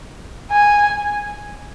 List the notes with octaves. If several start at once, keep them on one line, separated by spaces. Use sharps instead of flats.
G#5